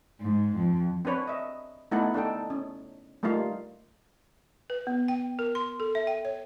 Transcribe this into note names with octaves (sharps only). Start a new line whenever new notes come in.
G#2
F2
C4 D4 B4 C#5
D#5 E5
A3 B3 D#4 E4 A4 F#5
D4 D#4 A4 G5
C#4
G3 A3 A#3 D#4 F4 F5
B4
B3
G5
A#4
C6
A4
E5
G5
C#5